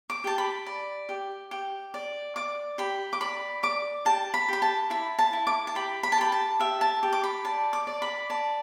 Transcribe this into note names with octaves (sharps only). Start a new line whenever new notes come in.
D6
G4 A5
B5
D5
G4
G4
D5
D5 D6
G4 B5
D6
D5 B5
D5 D6
G4 A5
B5
G4 B5
A5
E4 B5
A5
E4
D6
A5
G4 B5
B5
A5
G4 B5
A5
G4 E5
A5
G4
D6
B5
D5 A5
D6
D5
B5
D5 A5